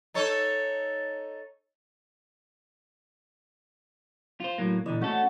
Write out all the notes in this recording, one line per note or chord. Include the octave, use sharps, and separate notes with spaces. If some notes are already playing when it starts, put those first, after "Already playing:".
D#4 A4 C#5
F4 C5
A2 F#3 A#3
A#2 D3 E3 D#5
A3 C#4 F#4 A4